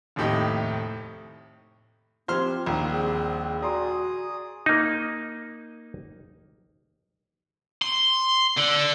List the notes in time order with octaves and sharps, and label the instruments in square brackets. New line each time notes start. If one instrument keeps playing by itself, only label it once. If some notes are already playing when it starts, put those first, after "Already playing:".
[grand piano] F1 D#2 A2 G4 D#5
[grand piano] F3 G4 G#6 [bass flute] C4 [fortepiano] C5 C6 F6
[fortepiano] A#1 [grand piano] D#2 A#2 [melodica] G3 C4 [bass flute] D4
[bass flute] G#4
[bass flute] F#4 [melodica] G#4 D#6 [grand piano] D5 A#5 C6
[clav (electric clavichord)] A#3 D#4
[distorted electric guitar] C6
D3